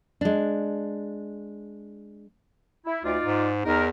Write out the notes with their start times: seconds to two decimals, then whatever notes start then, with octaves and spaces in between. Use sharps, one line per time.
0.21 G#3 D4
2.86 E4
3.04 D2 D#4 F4 D5
3.26 G#2
3.65 E2 D#4 A#4